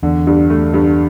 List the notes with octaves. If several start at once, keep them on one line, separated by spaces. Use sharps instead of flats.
E2 D3
G2
A3
G2